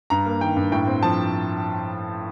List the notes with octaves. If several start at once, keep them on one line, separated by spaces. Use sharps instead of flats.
G2 A#5
A#3
D#3 G5
G2
A2 G5
C4
F3 A5